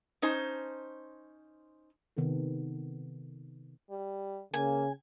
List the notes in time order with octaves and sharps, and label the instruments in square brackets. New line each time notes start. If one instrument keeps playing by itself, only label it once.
[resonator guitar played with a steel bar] C#4 D#4 C5 A5
[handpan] C3 D#3 B3 D#4 A4
[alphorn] G3
[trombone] C#3 [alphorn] A#3 [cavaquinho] G#5